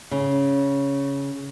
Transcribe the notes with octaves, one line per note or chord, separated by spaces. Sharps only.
C#3